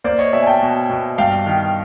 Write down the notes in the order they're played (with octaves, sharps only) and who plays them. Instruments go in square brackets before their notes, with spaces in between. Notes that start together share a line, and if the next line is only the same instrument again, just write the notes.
[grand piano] A#3 C5 D5
C#5 D#5
B2 D5 E5
G#5
G5 A5
B2
B2
G2 F5 G5
D#3